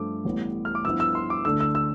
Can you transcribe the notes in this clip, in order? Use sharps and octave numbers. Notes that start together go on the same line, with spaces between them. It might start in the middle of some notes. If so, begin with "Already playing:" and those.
Already playing: G2 F3 A3 D6
A1 A2 G3 B3
F6
D6
G2 F3 B3 E4 E6
E6
C6
D6
D2 D3 A3 D4 E6
E6
E6